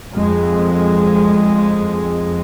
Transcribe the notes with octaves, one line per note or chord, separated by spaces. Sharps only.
F2 G#3